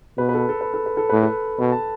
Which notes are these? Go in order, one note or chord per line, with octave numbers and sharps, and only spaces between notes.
B2 B4
B4
A4
A4
B4
A4
B4
A4
A2 B4
A4
B2 B4
A5